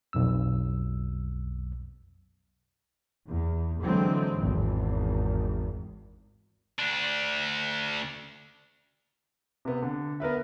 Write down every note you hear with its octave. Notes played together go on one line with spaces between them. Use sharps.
B1 F2 E6
E2
D3 E3 F#3 G#3 C4
G#1 E2
D2 D4
C3 B3
D3
B3 A#4 B4 E5